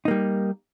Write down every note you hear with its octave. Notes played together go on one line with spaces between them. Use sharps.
G3 A#3 D#4